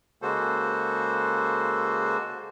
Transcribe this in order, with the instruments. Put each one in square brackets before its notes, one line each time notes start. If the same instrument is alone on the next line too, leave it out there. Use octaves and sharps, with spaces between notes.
[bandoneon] C#3 G#3 A#3 F#4 A4 C5